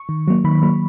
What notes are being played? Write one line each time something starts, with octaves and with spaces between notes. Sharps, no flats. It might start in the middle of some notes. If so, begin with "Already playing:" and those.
Already playing: C#6
D#3
F#3 A#3
D#3 B5
F#3 A#3